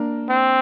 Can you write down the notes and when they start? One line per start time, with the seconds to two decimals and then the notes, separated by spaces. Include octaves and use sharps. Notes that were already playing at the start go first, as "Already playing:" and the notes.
Already playing: A#3 D4 A#4
0.30 C4